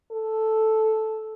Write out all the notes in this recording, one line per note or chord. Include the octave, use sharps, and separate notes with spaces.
A4